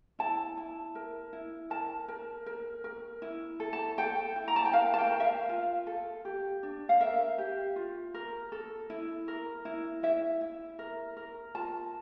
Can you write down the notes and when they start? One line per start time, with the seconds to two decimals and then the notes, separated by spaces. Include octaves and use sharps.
0.19 E4 A5
0.57 E4
0.95 A#4
1.33 E4
1.70 A#4 A5
2.08 A#4
2.46 A#4
2.84 A#4
3.22 E4
3.60 A4
3.73 A5
3.98 A4 G5
4.36 E4
4.48 A#5
4.56 A5
4.65 G5
4.73 A#4 F5
4.94 A5
4.98 G5
5.11 A#4
5.20 E5
5.24 F5
5.49 F4
5.87 A4
6.25 G4
6.63 D4
6.89 F5
7.01 A#4 E5
7.38 G4
7.76 F4
8.14 A#4
8.52 A4
8.90 E4
9.28 A#4
9.65 E4
10.03 E4 E5
10.41 E4
10.79 A#4
11.17 A#4
11.55 F4 A5